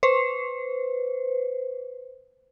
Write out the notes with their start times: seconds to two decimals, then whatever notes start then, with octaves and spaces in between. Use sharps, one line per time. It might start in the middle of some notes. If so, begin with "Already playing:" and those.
0.03 B4 C5